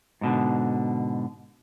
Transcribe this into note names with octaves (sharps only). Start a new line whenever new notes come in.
G#2 B2 D3